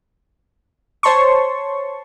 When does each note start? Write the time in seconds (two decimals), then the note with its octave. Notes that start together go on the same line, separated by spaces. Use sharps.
1.03 C5 C#5 A5 C6 C#6